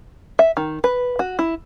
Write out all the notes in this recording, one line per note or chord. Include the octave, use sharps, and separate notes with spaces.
E5
D#3
B4
F#4
E4